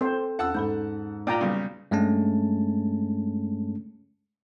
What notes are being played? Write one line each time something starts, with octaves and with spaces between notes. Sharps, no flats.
C4 A4 C5
E2 C#4 F#5 A5 E6
G#2 A4 B5 G6
A#2 D5 G5 A#5
B1 C#3 G3
G2 G#3 A3 C#4 A5